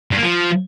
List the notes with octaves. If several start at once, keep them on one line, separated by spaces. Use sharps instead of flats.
G2
A#3
F3